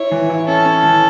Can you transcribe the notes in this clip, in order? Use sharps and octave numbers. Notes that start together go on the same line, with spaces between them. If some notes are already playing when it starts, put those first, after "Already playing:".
Already playing: E4 C#5
E3
E4
C#4 A4
C#4
E3